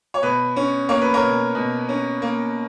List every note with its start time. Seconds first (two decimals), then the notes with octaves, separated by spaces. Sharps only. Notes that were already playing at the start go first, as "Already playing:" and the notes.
0.14 C#5
0.22 B2 B4
0.56 C#4
0.89 A#3 C#5
1.01 B4
1.14 A#4 C#5
1.22 B2
1.55 B2
1.89 C#4
2.22 A#3